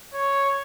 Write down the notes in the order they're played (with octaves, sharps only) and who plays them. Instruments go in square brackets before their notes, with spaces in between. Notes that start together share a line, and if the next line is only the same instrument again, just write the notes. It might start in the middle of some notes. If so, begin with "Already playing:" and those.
[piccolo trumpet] C#5